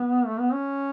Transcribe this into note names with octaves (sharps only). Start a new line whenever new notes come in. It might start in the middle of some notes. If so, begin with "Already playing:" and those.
Already playing: B3
A3
B3
C#4